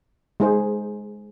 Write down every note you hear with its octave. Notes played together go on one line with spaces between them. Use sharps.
G#3 D#4 G#4 C5